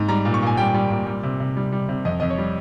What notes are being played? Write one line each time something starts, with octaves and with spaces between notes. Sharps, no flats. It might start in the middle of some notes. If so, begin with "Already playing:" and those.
Already playing: G#2
G3 A#5
A#2
C#6
A#2 G#5
G3 G5
G3
A#2
G3
C3
C3
G3
G3
C3
F2 D#5
F2 D#5
C#5
G3